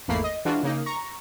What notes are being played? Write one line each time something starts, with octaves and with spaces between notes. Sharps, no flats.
G#1 E2 A3 A#3 B5 C7
D#5
E3 G#3 D4 F4 F#4
C#3 A#3 D#4
A#5 C#6